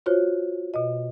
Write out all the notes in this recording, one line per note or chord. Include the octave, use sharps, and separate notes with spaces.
F4 F#4 C5 C#5
B2 D#5